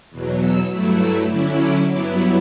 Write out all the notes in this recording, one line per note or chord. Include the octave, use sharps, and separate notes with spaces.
E2 B2 F#3
E6
G2 F#3 A3 E4
E6
D3 F#3 C#4 E4 D6
D6
G2 F#3 B3 E4 D6